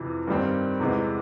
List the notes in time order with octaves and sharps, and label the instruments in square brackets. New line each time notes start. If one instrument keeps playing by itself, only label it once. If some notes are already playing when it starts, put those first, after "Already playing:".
Already playing: [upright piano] F2 C3 E3
G2 D#3 G3 C4
E2 C3 E3 G#3